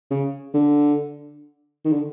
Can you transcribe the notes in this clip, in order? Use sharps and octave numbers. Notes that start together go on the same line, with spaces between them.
C#3
D3
D#3
D3